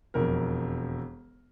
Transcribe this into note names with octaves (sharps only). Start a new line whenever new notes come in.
E1 F2 A#4